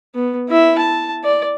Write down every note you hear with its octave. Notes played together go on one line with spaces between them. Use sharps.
B3
E4 E5
A5
D5